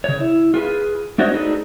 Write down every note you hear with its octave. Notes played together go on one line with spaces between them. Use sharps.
C#3 C#5
E4
F4 G#4 B4
A3 D4 F#4 C5 C#5 D#5
D4 D#4 F#4 G#4 A4 B4